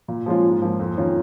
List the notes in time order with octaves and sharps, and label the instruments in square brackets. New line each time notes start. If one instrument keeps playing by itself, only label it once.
[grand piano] A#2
F3 G#3 C#4 F4
G#2
F3 A#3 F4
F2
D#3 C#4 F4